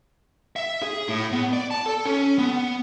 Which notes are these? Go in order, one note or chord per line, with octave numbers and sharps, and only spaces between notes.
E5
G#4
A2
B3
D5
A5
A4
C#4
B3